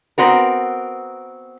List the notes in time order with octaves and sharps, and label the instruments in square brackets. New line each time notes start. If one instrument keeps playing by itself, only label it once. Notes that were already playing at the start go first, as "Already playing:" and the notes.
[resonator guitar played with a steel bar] B3 C4 F#4 A#4